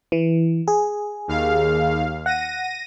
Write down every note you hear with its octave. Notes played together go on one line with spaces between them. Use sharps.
E3
G#4
D#2 F5
F#5 A#6 D#7